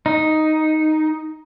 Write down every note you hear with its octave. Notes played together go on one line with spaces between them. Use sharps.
D#4